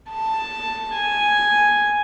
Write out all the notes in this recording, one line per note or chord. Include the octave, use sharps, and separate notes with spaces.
A5
G#5